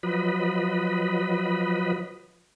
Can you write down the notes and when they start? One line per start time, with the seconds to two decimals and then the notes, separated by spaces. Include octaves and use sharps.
0.03 F3 F#3 B4 D#5 B5